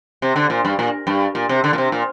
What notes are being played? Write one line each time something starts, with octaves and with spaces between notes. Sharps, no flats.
C3
D3
A#2
G2
A#2
G2
A#2
C3
D3
A#2
C3
A#2